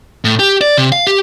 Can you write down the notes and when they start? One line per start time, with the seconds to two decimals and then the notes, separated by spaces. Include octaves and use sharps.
0.24 A2
0.39 G4
0.61 D5
0.77 C3
0.92 F5
1.07 G4